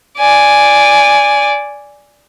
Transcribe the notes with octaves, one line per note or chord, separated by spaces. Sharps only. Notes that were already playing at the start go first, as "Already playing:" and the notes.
D5 G#5